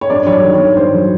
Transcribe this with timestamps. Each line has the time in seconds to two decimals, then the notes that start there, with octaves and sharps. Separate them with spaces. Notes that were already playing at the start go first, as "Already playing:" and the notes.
0.01 C#5
0.10 G2 D5
0.27 F#3 C#5
0.32 D5
0.43 D#3
0.54 C#5
0.59 G2
0.76 G2 C5
0.93 F#3